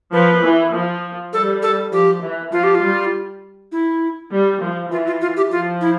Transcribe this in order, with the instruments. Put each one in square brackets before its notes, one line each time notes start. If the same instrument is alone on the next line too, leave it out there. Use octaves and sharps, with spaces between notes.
[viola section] F3 [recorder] B4
[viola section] E3
F3
[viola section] G3 [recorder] A4
[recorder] A4
[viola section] F3 [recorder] G4
[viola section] E3
[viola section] F3 [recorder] F4
[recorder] G4
F4
[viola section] G3
[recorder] E4
[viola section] G3
F3
[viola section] E3 [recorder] F4
[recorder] F4
F4
G4
[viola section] F3 [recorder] F4
[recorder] E4